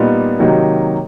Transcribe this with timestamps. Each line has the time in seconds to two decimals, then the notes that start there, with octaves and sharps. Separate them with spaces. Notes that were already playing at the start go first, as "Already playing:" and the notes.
Already playing: A#2 G3 B3 D#4
0.39 C3 D#3 F#3 A#3 D#4